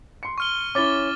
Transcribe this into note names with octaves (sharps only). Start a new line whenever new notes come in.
C6 C#7
C#6 F6 G7
C#4 E4 D6 A6 G7